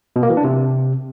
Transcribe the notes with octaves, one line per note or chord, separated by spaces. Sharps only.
B2
A#3
E3
D4
C3